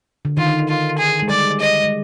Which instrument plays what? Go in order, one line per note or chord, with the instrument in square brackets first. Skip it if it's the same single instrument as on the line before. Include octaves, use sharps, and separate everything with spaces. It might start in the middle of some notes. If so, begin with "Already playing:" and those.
[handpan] D3
[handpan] D#3 [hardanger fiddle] F4
[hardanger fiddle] F4
G#4
[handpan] G#3
[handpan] G3 [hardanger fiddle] D5
[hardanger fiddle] D#5
[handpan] G#3